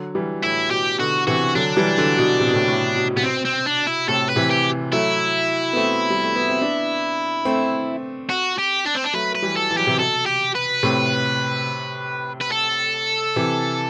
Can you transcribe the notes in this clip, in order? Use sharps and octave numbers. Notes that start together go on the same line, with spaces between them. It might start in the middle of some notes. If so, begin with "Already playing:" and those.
Already playing: D3 F#3
E3 G3
A2 E4
B2 G4
B2 D3 F#4
C3 E3 F#4
D3 F#3 D4
E3 G3
D3 F#3
B2
C3
B2
A2 C3
A2
B2
C3 B3
B2 C4
C4
D4
E4
A2 C3 A4
B4
C3 E3
G4
F#3 A3 E4
B3
A3 C4
G3
A3
B3
C4
B3 D4
A3 C4
F#4
G4
D4
C4
D4
F#3 A3 B4
B4
E3 G3
A4
E3
F#3 G4
C3 E3
B2 A4
G4
B4
A2 C3
B4
A4
C3 E3